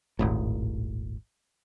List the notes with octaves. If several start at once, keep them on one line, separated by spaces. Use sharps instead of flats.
D#1 G#1 A2